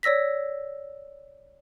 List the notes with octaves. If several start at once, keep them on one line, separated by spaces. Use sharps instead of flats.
C#5 D5 E6 A#6 B6